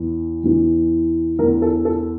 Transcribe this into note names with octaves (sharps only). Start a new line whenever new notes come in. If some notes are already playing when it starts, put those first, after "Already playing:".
Already playing: E2 E3
E2 E3
E2 E3 A#4
A4
A4